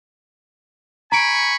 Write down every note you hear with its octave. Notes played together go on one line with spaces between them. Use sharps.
G#5 A#5 B5 C#6 D7